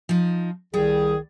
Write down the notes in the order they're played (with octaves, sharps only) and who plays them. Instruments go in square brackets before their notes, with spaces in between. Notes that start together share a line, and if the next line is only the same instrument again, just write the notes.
[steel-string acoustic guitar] F3 D#4
[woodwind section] C2 D#3 G#4 [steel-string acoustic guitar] G3